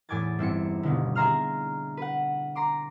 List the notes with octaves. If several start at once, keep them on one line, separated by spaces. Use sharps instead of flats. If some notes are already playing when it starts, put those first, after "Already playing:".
E2 A2 G#5 D6 G#6 A6
G1 C4 E4 C#7
D#1 B2 D3
G#4 E5 A#5 C6 F6
B4 F#5
A#5 C6 D6